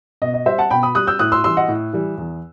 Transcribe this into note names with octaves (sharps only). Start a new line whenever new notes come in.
B2 D#5
D#5
G3 C5 E5
F#5 A5
B2 G5 B5
B5 D#6
G3 D#6 F#6
E6 G6
A2 D#6 F#6
C6 E6
E3 G3 C6 E6
D#5 F#5
A2
E3 G3
E2